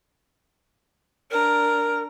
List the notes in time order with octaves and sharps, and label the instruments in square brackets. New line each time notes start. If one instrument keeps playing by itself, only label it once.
[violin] D4 A#5 [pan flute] A#4